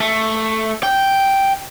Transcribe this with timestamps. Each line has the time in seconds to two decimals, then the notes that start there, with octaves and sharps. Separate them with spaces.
0.01 A3
0.83 G5